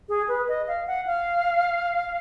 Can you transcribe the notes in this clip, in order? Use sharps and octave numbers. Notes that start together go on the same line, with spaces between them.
G#4
B4
D#5
F5
F#5
F5